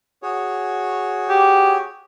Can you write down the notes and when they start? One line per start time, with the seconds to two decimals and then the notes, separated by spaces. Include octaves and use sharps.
0.23 F#4 G#4 C#5
1.29 G4